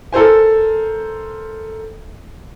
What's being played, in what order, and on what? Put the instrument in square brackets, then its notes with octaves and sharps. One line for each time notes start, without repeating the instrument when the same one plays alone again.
[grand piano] A4 A#4 C5 G#5